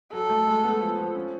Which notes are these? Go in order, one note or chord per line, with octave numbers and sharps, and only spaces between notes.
F#3 A4
A3
G#3
B3
F3
F3
C#4